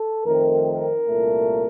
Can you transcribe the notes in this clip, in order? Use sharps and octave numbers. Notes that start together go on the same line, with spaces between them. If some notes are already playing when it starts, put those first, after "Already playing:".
Already playing: A4
F2 D#3 A3 C4 A#4
A#4
C2 A#2 A3